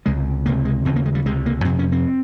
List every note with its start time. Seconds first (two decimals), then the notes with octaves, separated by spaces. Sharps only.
0.06 C#2 C3 G#3
0.46 C#2 C3 A#3
0.65 G#3
0.85 D#2 C#3 C4
0.96 A#3
1.06 G#3
1.15 G3
1.26 C#2 C3 G#3
1.46 A#3
1.65 F2 C3 C4
1.79 C#4
1.92 C4